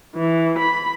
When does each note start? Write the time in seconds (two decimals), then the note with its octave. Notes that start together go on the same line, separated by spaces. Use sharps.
0.14 E3
0.59 B5